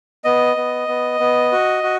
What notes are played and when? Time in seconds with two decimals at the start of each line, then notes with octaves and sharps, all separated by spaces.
0.25 B3 D#5
0.57 B3
0.88 B3
1.20 B3
1.52 F#4
1.83 F#4